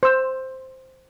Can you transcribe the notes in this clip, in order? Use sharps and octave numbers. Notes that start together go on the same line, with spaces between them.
C5 E6